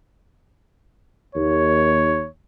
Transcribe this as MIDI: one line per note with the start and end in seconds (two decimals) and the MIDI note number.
1.35 2.23 39
1.35 2.29 73